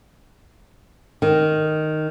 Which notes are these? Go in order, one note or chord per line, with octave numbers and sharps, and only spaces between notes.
D#3